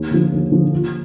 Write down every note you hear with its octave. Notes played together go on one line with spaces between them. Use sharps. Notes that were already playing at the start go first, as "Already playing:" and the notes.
Already playing: D#2
D3 F3
D#2
D3 F3
D#2